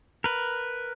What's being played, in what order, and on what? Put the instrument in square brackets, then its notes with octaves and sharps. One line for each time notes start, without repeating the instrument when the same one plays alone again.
[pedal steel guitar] A#4 B4